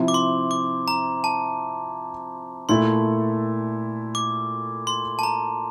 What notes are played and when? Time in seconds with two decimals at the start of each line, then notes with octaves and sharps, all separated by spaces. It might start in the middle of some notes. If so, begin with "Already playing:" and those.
Already playing: C3 F3 C4 E4
0.08 D6
0.14 C6
0.51 D6
0.88 A#5
1.24 A5
2.69 A#2 A3 E4 A4 C6
4.15 D6
4.87 C6
5.19 A5
5.23 A#5